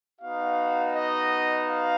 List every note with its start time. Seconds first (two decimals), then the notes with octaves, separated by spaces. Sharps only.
0.20 B3 D#4 F#4 F5
0.93 D#5
1.66 F5